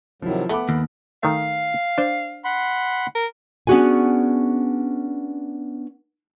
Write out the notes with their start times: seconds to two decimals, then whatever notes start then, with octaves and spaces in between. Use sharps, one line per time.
0.22 C3 D#3 F3 F#3 E4
0.49 A3 B3 F#5 B5 D6
0.69 D#2
1.23 D#3 A3 F5
1.98 D4 C5
2.44 F#5 B5 C6
3.15 A#4
3.67 B3 C#4 D4 F#4 G#4 G#5